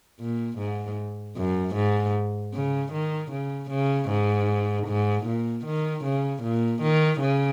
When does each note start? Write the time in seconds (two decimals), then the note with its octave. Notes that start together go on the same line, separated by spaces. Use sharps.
0.20 A#2
0.58 G#2
1.36 F#2
1.75 G#2
2.54 C#3
2.93 D#3
3.31 C#3
3.71 C#3
4.09 G#2
4.87 G#2
5.26 A#2
5.66 D#3
6.04 C#3
6.43 A#2
6.82 D#3
7.21 C#3